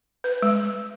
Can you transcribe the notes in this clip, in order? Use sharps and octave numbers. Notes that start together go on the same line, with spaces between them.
B4
G#3